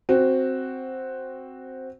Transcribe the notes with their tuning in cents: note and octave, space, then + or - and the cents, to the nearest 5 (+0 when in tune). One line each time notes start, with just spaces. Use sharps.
C4 +0 F#4 +0